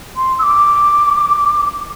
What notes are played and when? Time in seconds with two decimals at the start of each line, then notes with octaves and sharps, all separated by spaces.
0.16 C6
0.39 E6
0.42 D6